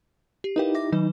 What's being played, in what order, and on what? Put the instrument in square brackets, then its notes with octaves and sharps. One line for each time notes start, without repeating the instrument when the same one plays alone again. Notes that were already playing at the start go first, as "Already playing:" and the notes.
[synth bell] G4
[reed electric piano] D#4 E4 G4 [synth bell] A#4 B4 F5
[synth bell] E5 D6 A#6
[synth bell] D#3 F#3 B4 [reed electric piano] D#4